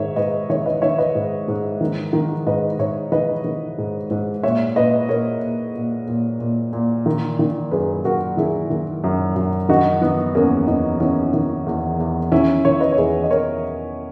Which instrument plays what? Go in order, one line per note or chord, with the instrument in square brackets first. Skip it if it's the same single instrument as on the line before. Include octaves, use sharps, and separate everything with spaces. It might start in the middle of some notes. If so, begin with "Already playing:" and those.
Already playing: [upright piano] G#2 D#3 C#5 E5
G#2 B4 D#5
D#3 C#5 E5
B4 D#5
D#3 C#5 E5
B4 D#5
G#2
G#2
D#3
D#3
G#2 B4 D#5
G#2 C#5 E5
D#3 B4 D#5
D#3
G#2
G#2
A#2 C#5 E5
A#2 B4 D#5
A#2 A#4 C#5
A#2
A#2
A#2
A#2
A#2
D#3
D#3
F#2 G#4 B4
F#2 F#4 A#4
D#3 E4 G#4
D#3
F#2
F#2
D#3 D#4 F#4
D#3 B3
E2 A#3 C#4
E2 B3 D#4
D#3 C#4 E4
D#3
E2
E2
D#3 C#4 E4
D#3 C#5 E5
B4 D#5
C#5
E2 G#4 B4
D#5
E2 A#4 C#5